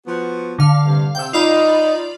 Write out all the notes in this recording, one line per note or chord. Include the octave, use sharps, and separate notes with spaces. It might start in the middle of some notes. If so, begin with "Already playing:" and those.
F3 B3 F#4
D3 F5
G2 C3
C3 G5 E6
D#4 F4 D5 B5